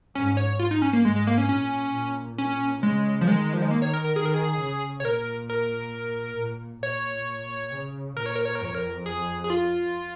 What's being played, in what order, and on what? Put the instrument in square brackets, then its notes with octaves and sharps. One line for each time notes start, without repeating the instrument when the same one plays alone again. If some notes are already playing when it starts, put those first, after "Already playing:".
[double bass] G#2 [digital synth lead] C#4
[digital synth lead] C#5
F4
D#4
C#4
A#3
[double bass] G#2 [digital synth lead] G#3
[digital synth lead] G#3
A#3
C#4
[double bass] A#2 [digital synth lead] C#4
[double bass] A#2
[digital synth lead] C#4
[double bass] C#3 [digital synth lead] G#3
[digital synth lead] F3
[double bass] D#3 [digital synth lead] G#3
[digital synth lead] F3
G#3
A#3
C#5
A#4
A#4
[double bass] D#3 [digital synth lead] G#4
[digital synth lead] A#4
G#4
[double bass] C#3
[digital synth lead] C#5
[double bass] A#2 [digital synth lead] A#4
[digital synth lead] A#4
[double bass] A#2
[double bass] A#2 [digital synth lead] C#5
[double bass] C#3
[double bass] A#2 [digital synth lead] A#4
[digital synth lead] C#5
A#4
C#5
A#4
[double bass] F2 [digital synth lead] C#5
[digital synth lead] A#4
G#4
G#4
F4